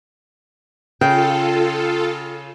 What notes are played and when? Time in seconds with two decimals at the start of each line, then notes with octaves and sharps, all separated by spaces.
1.01 C#3 F4 A4 G5